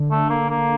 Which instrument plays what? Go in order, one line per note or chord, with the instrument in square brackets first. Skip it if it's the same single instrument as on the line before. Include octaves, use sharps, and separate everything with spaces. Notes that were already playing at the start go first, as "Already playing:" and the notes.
Already playing: [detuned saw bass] D3
[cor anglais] A3
A#3
A#3